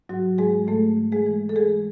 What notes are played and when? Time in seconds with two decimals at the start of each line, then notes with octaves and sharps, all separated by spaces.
0.09 G#2 F#3 F#4
0.38 G#2 G#3 G#4
0.67 G#2 A3 A4
0.97 E3
1.12 G#3 G#4
1.26 E3
1.49 A4
1.56 E3 G#3 G#4